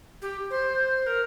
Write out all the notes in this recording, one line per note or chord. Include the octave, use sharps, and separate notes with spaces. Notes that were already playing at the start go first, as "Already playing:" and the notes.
G4
C5
A#4